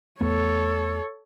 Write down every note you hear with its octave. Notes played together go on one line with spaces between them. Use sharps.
E2 A3 B3 A4 C#5